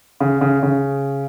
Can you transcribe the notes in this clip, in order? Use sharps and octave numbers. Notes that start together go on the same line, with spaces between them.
C#3
C#3
C#3